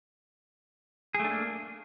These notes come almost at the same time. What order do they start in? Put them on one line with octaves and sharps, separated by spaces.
G#4 A3 D4 A#3